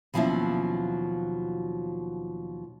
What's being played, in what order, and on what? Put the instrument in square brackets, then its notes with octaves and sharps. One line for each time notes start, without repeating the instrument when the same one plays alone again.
[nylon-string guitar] D#2 B2 F3 F#3 C#4 E4